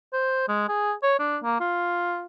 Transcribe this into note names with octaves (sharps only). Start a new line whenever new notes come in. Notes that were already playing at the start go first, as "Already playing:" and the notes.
C5
G#3
G#4
C#5
D4
A#3
F4